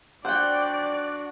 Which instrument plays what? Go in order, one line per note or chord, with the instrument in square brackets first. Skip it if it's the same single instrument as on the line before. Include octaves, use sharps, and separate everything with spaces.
[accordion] D4 F#4 [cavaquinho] C5 G5 [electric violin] D5 [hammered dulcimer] F#5